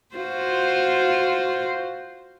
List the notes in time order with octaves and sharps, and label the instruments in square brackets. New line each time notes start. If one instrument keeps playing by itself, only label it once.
[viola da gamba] F4 F#4 C5